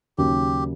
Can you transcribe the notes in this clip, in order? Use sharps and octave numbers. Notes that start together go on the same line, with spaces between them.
D#2 C#3 F#3 G4